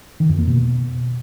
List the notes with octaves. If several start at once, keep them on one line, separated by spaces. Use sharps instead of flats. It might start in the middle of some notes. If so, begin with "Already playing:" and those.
D#3
F2
A#3
B2